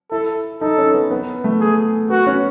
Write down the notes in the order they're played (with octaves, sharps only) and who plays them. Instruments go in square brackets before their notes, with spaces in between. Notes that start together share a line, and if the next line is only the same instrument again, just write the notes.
[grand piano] E4 [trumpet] A4
[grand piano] D#4 [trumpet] A4
[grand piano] C#4
B3
B3
A3
[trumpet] G#4
[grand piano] B3 [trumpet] F#4
[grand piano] C#4